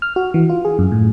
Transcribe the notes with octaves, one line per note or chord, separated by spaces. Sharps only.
F6
F#4
E3
F4
G#4
F#2
A2